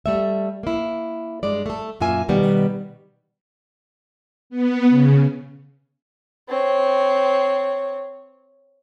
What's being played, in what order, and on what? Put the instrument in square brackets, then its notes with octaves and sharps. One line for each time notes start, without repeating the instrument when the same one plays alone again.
[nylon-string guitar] G3 A3 E5
A#3 E4
G2 G#3 D5
A3 A4
F#2 A#2 A#3 F4 E5 G#5
B2 D#3 G3 B3
[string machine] B3
C#3
[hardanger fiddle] C4 C#5